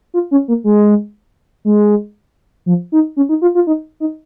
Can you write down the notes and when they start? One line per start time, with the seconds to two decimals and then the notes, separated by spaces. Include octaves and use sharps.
0.14 F4
0.31 C#4
0.48 A#3
0.64 G#3
1.65 G#3
2.66 F3
2.92 D#4
3.17 C#4
3.29 D#4
3.42 F4
3.55 F4
3.67 D#4
4.00 D#4